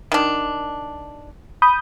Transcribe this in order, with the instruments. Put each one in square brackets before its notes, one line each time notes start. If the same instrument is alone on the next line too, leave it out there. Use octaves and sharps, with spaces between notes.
[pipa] D#3 D4
[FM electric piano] B5 D#6 G6